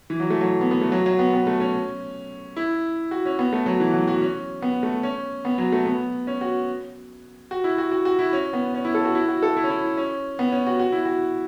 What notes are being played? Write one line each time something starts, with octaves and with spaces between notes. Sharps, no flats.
E3
F#3
A3
F#3
B3
B3
A3
F#3
F#3
B3
B3
A3
C#4
E4
F#4
C#4
B3
A3
F#3
E3
F#3
F#4
C#4
B3
A3
C#4
B3
F#3
A3
B3
C#4
F#4
F#4
E4
F#4
F#4
F#4
E4
C#4
B3
C#4
E4
A4
F#4
E4
F#4
A4
E4
C#4
E4
C#4
B3
C#4
F#4
F#4
E4
F#4